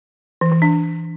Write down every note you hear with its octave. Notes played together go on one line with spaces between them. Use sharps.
E3
E3
D4